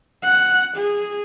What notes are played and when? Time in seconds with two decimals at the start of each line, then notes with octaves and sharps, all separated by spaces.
0.24 F#5
0.76 G#4